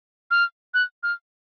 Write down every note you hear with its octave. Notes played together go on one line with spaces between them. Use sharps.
F6
F#6
F6